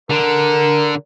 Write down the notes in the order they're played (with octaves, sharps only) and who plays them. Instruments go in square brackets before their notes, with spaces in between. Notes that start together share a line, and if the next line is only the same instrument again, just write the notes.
[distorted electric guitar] D3 [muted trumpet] A#4